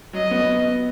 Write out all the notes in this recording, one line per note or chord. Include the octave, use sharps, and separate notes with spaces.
F#3 D#5
B3